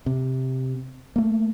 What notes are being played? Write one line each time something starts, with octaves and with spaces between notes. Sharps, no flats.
C3
A3 A#3